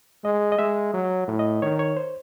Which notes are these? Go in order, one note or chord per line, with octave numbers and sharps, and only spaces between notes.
G#3 D#5
D#5
G#3 E5
F#3
A2
D#5
D#3 C#5
C#5
C5